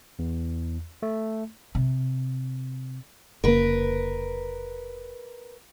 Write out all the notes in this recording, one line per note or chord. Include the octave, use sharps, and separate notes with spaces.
E2
A3
C3
F1 C#3 A#3 A#4 B4